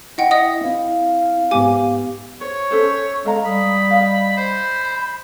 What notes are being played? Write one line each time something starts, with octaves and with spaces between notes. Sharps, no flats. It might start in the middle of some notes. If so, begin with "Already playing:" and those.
E4 D#5 E5 F#5 G5
D#5 F#5 D#6
C4 E4 F5
G#2 B3 G4 G#5 D6
C5 C#5 C#6
C#4 A4 C5
G#3 A4 D#5 F5 A#5
G3 B5 D#6
D#5 F5
C5 B5